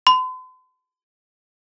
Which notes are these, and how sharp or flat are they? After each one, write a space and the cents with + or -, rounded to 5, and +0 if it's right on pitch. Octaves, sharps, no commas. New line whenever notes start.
C6 -45